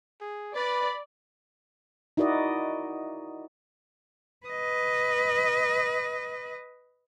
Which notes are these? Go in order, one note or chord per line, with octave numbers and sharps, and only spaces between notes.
G#4
B4 D5 B5
D#4 E4 F#4 A#4 D5 D#5
B4 D#5